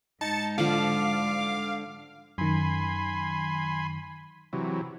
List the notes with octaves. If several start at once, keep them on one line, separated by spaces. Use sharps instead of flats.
G#2 D#4 A5 A6 C#7
D3 F3 F5 D6
F#2 D#3 G#5 B5 C6
C3 E3 F#3